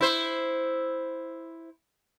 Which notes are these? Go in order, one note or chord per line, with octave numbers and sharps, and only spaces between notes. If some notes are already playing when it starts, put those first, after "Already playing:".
E4 C5